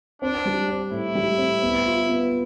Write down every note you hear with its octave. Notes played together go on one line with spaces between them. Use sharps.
C4 D4
G3
C4
A2 E4
G3
C4
B3
F4
B3